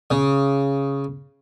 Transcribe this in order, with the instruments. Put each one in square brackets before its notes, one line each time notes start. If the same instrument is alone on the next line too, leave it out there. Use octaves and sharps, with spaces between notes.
[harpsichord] C#3